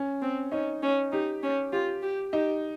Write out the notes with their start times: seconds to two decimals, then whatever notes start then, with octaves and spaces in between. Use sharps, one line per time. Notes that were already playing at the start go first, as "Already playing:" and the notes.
Already playing: C#4
0.22 C4
0.52 C#4 D#4
0.83 C#4
1.12 D#4 G4
1.43 C#4
1.72 F4 G4
2.02 G4
2.33 D#4 G4